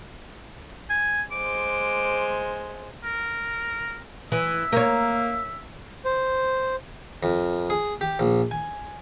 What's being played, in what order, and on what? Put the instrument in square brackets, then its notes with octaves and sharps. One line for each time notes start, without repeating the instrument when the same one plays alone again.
[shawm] G#5
[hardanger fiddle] G#3 C5 [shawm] D6
[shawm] A#4
[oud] E3 [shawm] E5
[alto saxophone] A#3 [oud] A#4 C#5
[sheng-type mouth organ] C5
[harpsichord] F2
G#4
G4
A#1
G#5